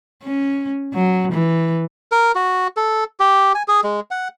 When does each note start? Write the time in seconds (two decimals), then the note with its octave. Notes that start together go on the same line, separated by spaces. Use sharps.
0.23 C#4
0.94 F#3
1.32 E3
2.12 A#4
2.35 F#4
2.77 A4
3.20 G4
3.55 G#5
3.68 G#4
3.84 G#3
4.11 F#5